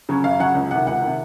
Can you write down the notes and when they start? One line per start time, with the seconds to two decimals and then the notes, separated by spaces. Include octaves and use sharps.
0.09 C#3 F#3 C#4
0.24 F#2 F5
0.40 C#3 F#3 C#4 F#5
0.55 C#2
0.71 C3 D#3 F#5
0.86 C#2 F#5
1.02 C3 D#3